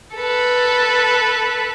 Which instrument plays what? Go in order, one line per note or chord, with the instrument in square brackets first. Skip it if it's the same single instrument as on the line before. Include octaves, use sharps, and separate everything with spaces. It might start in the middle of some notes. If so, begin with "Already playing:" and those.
[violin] A4 B4